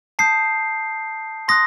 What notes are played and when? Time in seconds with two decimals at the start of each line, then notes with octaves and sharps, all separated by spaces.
0.19 A5 D#6 G6 C7
1.48 C6 D#6 F#6 A#6